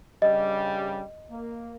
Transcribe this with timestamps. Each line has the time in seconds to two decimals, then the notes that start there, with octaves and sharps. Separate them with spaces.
0.22 G2 C#3 G3 D#5
1.30 A#3